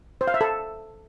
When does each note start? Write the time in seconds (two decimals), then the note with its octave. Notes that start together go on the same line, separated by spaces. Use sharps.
0.21 C5
0.27 F5
0.34 E5
0.41 A4